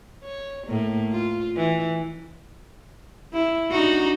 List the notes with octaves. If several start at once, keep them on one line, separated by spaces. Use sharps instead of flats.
C#5
A2 A#3
F4
E3
E4
D4 D#4 F#4